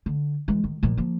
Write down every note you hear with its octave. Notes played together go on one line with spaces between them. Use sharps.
D3
E3 G#3
D#3
A#2 F3
F3 A#3